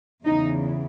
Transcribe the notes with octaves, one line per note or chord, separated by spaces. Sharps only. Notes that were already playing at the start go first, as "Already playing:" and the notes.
E2 C#3 E3 D#4